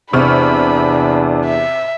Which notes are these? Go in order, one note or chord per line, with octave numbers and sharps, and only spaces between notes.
E2 C3 D4 B5 C#6 F6
E5